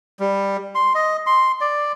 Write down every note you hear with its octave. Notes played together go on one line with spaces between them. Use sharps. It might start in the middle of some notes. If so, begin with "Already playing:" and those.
G3
C6
D#5
C6
D5